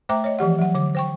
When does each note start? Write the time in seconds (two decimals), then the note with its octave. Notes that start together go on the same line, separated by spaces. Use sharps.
0.09 A3 C5 E5 G5 A#5 D6
0.24 C#5 D#5
0.39 E3 F3 G4 F#5
0.59 F#3 F#5
0.75 D3 D6
0.95 C5 G5 C#6